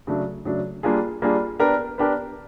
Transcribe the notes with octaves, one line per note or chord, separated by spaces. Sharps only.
C#3 F#3 A3 D4
C#3 F#3 A3 D4
G3 A#3 D4 F4 G#4
G3 A#3 D4 F4 G#4
B3 D4 G4 A#4
B3 D4 G4 A#4